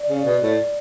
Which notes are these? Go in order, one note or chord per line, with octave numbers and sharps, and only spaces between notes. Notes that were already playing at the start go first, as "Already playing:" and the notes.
Already playing: D5
C#3
B2
A2